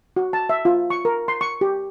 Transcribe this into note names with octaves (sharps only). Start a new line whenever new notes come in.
F#4
A5
E5
F4
C#6
A#4
C6
C#6
G4